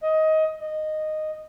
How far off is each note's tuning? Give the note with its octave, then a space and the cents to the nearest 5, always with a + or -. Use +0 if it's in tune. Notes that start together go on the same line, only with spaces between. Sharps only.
D#5 +20
D#5 -10